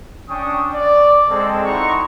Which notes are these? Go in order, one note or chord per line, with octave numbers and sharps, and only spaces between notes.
C#4 D4 G5 C#6 D#6
D5
G#3 C4 A4
D#4 E4 F#4 A#5 C6 C#6